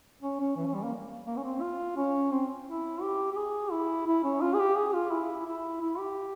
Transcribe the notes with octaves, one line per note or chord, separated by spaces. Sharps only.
C#4
C#4
E3
C#4
G3
A#3
A#3
C#4
C4
F4
C#4
C4
E4
G4
G4
G#4
E4
E4
C#4
F4
G#4
G4
G#4
F4
E4
E4
E4
G4